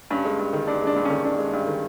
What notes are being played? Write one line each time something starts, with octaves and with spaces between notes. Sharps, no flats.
G2 C#4
G#3
G2
D#3
G2 D4
G#3 D4
G2
C#4
D#3
G2 D4
G#3
G2
D#3